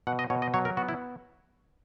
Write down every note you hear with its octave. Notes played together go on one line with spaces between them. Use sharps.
B2 F#5
D#5
B2 C#5
D#5
F#3 C#5
A#4
B3 F#4
E4